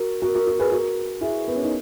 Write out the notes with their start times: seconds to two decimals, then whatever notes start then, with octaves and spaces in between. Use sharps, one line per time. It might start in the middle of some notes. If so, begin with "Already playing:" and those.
Already playing: F#4 A#4
0.22 F#4 A#4
0.35 F#4 A#4
0.47 F#4 A#4
0.59 G#4 B4
0.71 F#4 A#4
1.21 E4 G#4
1.48 B3
1.55 C#4
1.63 D#4